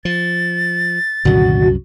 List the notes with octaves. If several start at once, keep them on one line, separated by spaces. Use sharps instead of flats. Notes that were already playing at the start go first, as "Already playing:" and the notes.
F3 A6
C2 F#2 A#2 D3 D#3 F#4